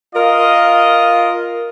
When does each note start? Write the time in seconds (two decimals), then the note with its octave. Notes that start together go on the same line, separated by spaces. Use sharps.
0.15 F4 A#4 D#5